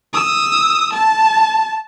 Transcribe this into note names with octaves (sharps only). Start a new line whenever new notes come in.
D#6 E6
A5